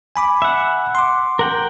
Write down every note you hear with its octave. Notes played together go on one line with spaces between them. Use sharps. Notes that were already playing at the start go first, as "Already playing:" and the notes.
G#5 B5 D6
E5 F#5
C6 D6
A#4 F#5 G5